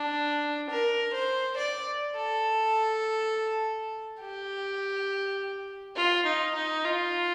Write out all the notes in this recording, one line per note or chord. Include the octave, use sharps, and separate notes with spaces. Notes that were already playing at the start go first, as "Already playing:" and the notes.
Already playing: D4
A#4
C5
D5
A4
G4
F4
D#4
D#4
F4